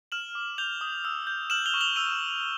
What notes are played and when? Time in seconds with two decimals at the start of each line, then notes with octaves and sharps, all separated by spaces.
0.12 F6 E7 F#7
0.35 D6
0.58 G6 F7 G7
0.81 D#6
1.05 E6
1.27 G6
1.50 F6 E7 F#7
1.66 F7 G7
1.74 C#6
1.81 F7 G7
1.96 E6 D#7 F7